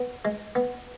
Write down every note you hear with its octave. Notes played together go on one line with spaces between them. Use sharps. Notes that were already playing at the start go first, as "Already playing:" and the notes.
Already playing: B3
G#3
B3